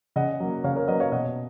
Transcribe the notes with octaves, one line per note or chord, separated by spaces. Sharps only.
C#3 D#5 F#5
F#3 A#3
C#3 C#5 F5
A#4 C#5
F#3 A#3 B4 D#5
C#5 F5
B2 D#5 F#5